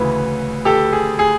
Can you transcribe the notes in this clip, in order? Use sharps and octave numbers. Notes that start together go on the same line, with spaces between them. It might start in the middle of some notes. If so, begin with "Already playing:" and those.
Already playing: D2 C#3 E3 B4
G4 A4
G#4
G#4